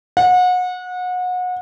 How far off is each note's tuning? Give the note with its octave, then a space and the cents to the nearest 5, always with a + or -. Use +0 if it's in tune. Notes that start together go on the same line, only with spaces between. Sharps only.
F#5 -30